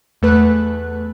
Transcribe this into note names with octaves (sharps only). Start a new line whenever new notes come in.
E2 A3 B4 F#6